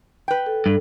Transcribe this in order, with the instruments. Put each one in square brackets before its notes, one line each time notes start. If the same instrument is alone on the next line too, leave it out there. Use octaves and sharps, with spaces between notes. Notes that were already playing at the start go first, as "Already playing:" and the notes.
[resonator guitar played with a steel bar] B4 G5
[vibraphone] A4
[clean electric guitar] G2